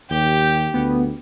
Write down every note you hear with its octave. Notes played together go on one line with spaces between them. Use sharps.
D#2 G4 G6
D2 B3